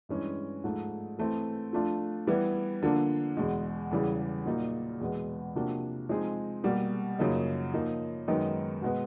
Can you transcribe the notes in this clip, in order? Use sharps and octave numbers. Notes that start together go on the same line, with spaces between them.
G2 E3 G#3 C#4
G#2 F3 A3
E3 A3 C4
F3 A3 D4 F4
E3 G3 B3 E4
D3 F3 A#3 D4
E2 B2 G#3
E2 C#3 E3 G3
A#2 F#3 A#3 D#4
E2 B2 G#3 B3
C3 F3 A#3 D4 F#4
F3 G#3 C4 D#4 G#4
B2 G3 A#3
F#2 C#3 F3 A#3 D#4
F3 A#3 D#4
F#2 D#3 G#3 B3 D#4
B2 G#3 B3